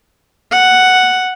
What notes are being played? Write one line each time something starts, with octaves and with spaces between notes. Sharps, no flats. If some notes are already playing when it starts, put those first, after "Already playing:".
F#5